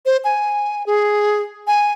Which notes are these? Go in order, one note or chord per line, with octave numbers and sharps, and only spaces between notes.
C5
G#5
G#4
G#5